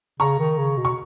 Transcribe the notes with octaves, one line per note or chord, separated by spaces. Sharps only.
C#3 A#5 C#6
D#3
C#3
B2
C#6